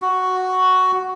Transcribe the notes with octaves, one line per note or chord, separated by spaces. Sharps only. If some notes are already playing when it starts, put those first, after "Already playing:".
F#4